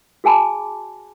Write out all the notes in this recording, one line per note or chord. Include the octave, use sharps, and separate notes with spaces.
F#4 G#4 G#5 A5 B5 D6